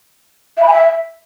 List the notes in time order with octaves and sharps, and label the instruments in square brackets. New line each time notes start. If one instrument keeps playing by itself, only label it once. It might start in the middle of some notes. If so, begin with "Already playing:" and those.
[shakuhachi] E5
B5
G#5
E5